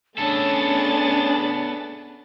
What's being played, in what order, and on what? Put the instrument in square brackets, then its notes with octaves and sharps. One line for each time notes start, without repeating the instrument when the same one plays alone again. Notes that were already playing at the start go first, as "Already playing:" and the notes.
[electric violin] A3 D4 [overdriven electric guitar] B3 A4 [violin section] C#4 G#4 A6 [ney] A5